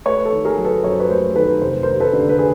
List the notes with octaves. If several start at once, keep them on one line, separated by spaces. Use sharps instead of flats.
A3 B4 C#5
A4
D#3
G#4 A#4
F#3
A4 B4
F#2 C#5
C5
B4 C#5
A3 A#4 C5
D#3 A4 B4
F1 C5
B4
D#2 A#4 C5
A4 B4
D3
B4
G#4